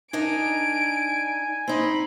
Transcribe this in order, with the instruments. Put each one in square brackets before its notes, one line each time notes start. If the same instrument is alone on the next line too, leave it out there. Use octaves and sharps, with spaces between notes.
[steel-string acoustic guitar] D4 D#4 A#4 [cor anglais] G#5 [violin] D7
[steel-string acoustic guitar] C4 D#4 [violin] B5